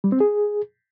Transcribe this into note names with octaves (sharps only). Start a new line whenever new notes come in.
G3
C4
G#4